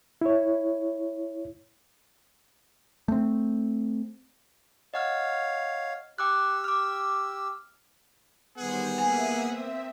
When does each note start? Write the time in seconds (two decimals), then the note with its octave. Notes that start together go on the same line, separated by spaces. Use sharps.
0.21 E4 C#5
3.08 A3 C4
4.94 C#5 D#5 F5 F#5 F6
6.18 G4 G5 D6 E6 F#6
6.64 D6 F6
8.58 D#3 G3 B3 G#4 C5 F#5
8.98 A#3 E5 G#5 D#6
9.46 C4 E5